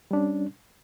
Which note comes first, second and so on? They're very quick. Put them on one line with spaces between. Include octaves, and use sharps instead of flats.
G3 D4 C#4